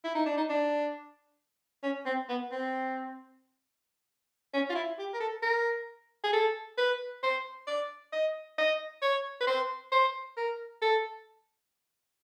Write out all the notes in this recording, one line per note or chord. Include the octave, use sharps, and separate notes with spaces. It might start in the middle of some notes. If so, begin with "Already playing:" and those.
E4
D#4
D4
D#4
D4
C#4
C4
B3
C4
C#4
F4
E4
G4
A#4
A4
A#4
G#4
A4
B4
C5
D5
D#5
D#5
C#5
B4
C5
C5
A#4
A4